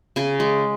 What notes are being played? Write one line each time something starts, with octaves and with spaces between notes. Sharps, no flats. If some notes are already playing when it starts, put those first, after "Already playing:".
C#3 G#5
G#3